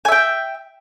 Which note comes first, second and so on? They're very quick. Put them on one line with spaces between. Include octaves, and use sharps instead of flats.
G#5 E5 G5